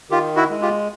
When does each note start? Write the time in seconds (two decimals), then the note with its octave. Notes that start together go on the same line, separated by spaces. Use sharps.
0.10 D#3 F4 G4
0.36 E4 F#4
0.49 G#3
0.62 F4 G4